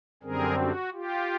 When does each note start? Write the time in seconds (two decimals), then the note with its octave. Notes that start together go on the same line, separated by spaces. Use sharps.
0.23 F#2 D3 G3 C4 G#4 A#4
0.59 F#4
0.93 F4 G4